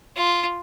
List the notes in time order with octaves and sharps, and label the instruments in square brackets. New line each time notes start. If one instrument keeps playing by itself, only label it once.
[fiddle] F4